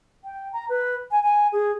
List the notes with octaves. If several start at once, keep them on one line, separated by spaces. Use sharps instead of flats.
G5
A#5
B4
G#5
G#5
G#4